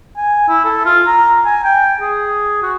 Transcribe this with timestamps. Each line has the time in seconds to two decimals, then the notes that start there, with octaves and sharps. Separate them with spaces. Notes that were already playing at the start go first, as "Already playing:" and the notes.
0.17 G#5
0.49 E4
0.65 A4
0.85 F4
1.07 A#5
1.45 G#5
1.64 G5
2.01 G#4
2.63 F#4